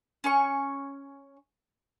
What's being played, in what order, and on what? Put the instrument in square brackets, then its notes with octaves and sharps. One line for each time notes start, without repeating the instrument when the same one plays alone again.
[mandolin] C#4 G#5 C#6